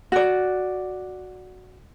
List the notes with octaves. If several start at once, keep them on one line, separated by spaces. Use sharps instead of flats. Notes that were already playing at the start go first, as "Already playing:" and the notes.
F#4 D5